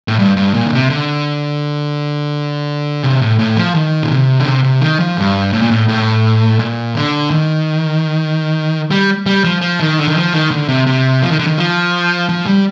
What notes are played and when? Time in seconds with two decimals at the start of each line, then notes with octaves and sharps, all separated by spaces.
0.08 A2
0.19 G2
0.37 G2
0.54 A#2
0.66 D3
0.72 C3
0.90 D3
3.03 C3
3.21 A2
3.39 A2
3.57 F3
3.75 D#3
4.02 A#2
4.10 C3
4.40 D3
4.46 C3
4.64 C3
4.81 D#3
5.00 F3
5.17 G2
5.53 A2
5.61 A#2
5.71 A2
5.89 A2
6.59 A#2
6.95 D3
7.31 D#3
8.91 G3
9.26 G3
9.44 F3
9.61 F3
9.80 D#3
9.98 D3
10.07 D#3
10.15 F3
10.33 D#3
10.51 D3
10.68 C3
10.87 C3
11.22 F3
11.30 D#3
11.39 D3
11.47 D#3
11.58 F3
12.29 F3
12.46 G3